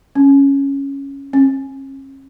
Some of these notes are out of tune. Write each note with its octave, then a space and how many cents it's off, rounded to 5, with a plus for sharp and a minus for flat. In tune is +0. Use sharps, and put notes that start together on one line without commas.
C#4 -5
C#4 -40